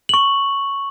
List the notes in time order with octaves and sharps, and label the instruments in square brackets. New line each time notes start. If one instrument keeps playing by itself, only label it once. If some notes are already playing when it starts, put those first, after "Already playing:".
[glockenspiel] C#6 F#7